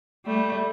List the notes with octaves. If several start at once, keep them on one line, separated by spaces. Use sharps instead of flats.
G3 A3